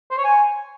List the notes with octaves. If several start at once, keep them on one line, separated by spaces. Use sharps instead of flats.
C5
C#5
G#5